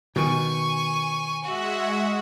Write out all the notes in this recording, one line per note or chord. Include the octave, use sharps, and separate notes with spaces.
B2 D#3 G#5 C#6
G#3 F#4 E5 F#5